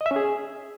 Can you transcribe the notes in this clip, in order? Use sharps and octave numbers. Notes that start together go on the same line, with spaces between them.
D#5
E5
C#4
G#4